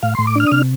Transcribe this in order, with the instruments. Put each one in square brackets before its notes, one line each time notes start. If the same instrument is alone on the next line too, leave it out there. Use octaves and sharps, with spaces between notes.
[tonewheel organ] A2 F5
A2 C6
D6
D4 F6
D#6
C3 F6